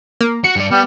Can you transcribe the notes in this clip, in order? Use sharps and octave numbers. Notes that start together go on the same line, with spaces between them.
A#3
F#4 C#7
G2 D5
G3 B3